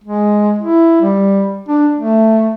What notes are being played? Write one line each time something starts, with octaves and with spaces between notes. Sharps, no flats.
G#3
E4
G3
D4
A3